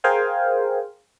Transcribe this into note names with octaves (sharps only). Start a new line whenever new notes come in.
G#4 A#4 C5 F5 G5 G#5